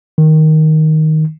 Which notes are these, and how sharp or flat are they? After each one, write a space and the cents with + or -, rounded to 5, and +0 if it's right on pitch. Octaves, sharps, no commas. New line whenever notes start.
D#3 +5